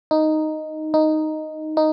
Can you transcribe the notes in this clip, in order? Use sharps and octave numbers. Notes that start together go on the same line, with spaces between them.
D#4
D#4
D#4